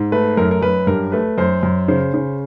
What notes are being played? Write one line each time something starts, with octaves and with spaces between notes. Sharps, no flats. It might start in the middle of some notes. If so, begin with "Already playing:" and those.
Already playing: G#2
A3 B4
F#2 A#4
A#4
F#2 B4
G2 A#4
A3 B4
F#2 C5
F#2
C#3 C5
C#3